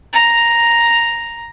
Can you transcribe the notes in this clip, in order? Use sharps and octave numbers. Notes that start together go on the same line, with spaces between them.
A#5